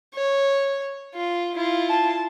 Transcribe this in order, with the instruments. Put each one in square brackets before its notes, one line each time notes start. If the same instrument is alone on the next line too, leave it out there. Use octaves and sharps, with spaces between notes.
[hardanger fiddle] C#5
F4
E4 F4
[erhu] A5